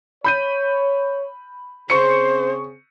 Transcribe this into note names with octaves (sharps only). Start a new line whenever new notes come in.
C#5 B5 G6 D#7
C#3 C4 G#4 C5 C#6 C#7